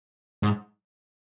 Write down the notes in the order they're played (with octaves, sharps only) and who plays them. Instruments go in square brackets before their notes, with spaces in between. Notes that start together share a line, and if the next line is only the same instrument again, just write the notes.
[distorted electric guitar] G#2